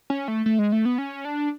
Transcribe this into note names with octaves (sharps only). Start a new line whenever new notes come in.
C#4
A3
A3
G#3
A3
B3
C#4
D4